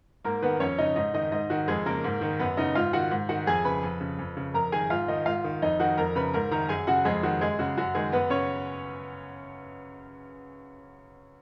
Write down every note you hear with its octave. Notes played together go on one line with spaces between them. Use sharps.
G#2 A#3 A#4
D#3 B3 B4
F2 C#4 C#5
C#3 D#4 D#5
G#2 D#4 D#5
D#3 D#4 D#5
G#2 D#4 D#5
D#3 F#4
F2 G#3 G#4
C#3 A#3 A#4
G#2
D#3
F#2 B3 B4
C#3 D#4 D#5
G#2 F4 F5
D#3 F#4 F#5
G#2
D#3 F#4 F#5
F2 G#4 G#5
C#3 B4 B5
F2
C#3
F2
C#3
F2 A#4 A#5
D#3 G#4 G#5
G#2 F4 F5
D#3 D#4 D#5
G#2 F4 F5
D#3
F2 D#4 D#5
D#3 F#4 F#5
F2 A#4 A#5
C#3 B4 B5
G#2 A#4 A#5
D#3 A#4 A#5
F#2 G#4 G#5
C#3 F#4 F#5
F2 G#3 G#4
D#3 F#4
F#2 G#3 G#4
C#3 F#4
F#2 F#4
D#3 G#3 G#4
F#2 B3 B4
C#3 C#4 C#5